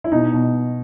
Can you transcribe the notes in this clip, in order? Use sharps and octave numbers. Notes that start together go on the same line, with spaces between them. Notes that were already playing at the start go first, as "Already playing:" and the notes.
E4
B2 D#4
B2